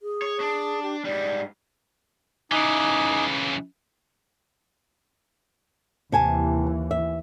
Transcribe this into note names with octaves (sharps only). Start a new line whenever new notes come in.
G#4
C#5
D4
G4
G#2 G3 D5
C#3 E3 D#4 G#5 D6
D#2 C3 E3 G#5 A5
E5